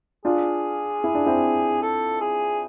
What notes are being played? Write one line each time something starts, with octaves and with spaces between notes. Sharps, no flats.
D4 F4 G#4
E4
D4
C4 E4
A4
G#4